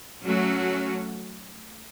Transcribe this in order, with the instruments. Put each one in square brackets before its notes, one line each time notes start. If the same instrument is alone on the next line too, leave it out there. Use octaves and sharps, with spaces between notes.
[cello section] F#3 A3 C#4 F#4